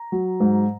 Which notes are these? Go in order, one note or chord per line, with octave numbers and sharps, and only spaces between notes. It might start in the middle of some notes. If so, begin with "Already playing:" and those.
Already playing: A#5
F#3
G#2